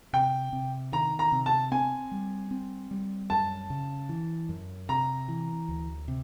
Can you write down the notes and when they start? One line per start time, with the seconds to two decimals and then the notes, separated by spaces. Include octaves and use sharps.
0.13 C3 G5
0.53 C3
0.92 D#3 A#5
1.19 A#5
1.32 C3
1.46 A5
1.72 C4 G#5
2.11 G3
2.51 C4
2.91 G3
3.30 F#2 A5
3.70 C#3
4.09 E3
4.49 F#2
4.89 C3 A#5
5.28 E3
5.68 D2
6.08 C3